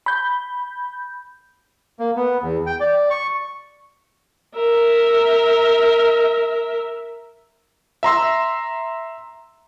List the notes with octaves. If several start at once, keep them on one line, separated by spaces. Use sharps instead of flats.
B5 G6
A#3
B3
E2
G5
D5
C#6
A#4 E5
E5 A#5 C6 E6